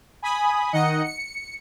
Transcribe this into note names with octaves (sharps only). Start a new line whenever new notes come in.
G#5 B5 D#6
D#3 D#4 D#5 F#5 C#7
C#7